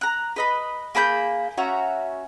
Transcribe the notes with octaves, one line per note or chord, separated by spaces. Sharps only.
A#5 F#6
B4 D#5 B5
A#3 G#4 B5 G6
C#4 F#4 E5 A#5